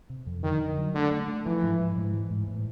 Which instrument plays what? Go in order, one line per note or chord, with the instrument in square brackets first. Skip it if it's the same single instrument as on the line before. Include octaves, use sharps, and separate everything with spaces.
[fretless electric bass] C3
F2
[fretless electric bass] D3 [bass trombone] D#3
[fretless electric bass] D3
F#3
[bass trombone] D3 [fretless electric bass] A3
[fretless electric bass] A3
A3
[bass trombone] E3 [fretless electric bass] F3
[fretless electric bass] G#2
G#2
G#2
E3
G#2
A2